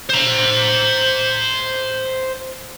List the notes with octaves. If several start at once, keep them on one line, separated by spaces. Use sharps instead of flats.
C5 A#5